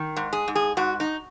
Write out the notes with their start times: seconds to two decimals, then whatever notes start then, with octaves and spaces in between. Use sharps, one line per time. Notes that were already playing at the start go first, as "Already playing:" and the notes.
Already playing: D#3
0.17 G#2
0.33 G#4
0.48 G#2
0.55 G#4
0.77 G#2 F#4
1.00 D#4